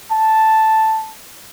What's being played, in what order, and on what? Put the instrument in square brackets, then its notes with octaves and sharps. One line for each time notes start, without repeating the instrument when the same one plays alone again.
[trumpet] A5